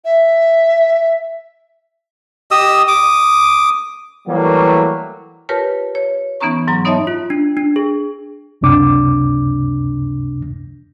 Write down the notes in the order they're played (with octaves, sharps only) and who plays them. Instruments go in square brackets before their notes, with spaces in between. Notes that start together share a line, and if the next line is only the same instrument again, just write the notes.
[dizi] E5
[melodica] G4 D#5 D#6 E6
D6 D#6
[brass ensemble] E3 F#3 G3 A3 A#3
[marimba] F4 G4 A#4 B4 C#5 A5
C#5
E3 B3 C#4 D#4 A#5 C#6
G#2 F#3 A#5
B3 D#4 C#5 D#5 E5 A5
[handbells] F4
D4
D4
G#4
[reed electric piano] C#2 F#2 C3 D4 D6